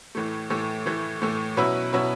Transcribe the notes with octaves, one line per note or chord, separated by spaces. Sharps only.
A2 E3 A3
A2 E3 A3
A2 E3 A3
A2 E3 A3
B2 F#3 C#4 E4 B4
B2 F#3 C#4 E4 B4